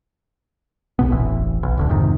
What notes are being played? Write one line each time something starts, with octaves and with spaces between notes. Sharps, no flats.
C2 B2 B3
E1 A1 E3
B1
D1 D2 D3
F2 G#2 C3 D#3